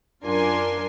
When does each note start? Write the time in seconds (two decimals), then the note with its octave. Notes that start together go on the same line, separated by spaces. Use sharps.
0.23 F#2 D4 F4 A#4 G#5 C6